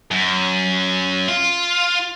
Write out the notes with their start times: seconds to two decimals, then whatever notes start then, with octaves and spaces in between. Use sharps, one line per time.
0.11 F#2
1.28 F4